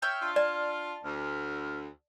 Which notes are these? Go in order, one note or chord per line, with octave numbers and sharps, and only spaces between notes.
C#5 E5 G5 F6
D4 F4
D5 A5
D2 F6